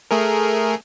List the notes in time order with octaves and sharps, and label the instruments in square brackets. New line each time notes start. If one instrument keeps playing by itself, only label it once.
[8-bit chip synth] A3 G#4 A#4